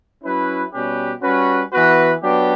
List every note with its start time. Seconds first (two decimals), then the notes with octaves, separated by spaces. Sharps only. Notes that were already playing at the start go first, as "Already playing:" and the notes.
0.24 F#3 C#4 E4 B4
0.73 B2 G3 C#4 G4 B4
1.22 G3 C#4 F#4 B4
1.72 E3 B3 F#4 B4
2.22 F#3 B3 D4 G4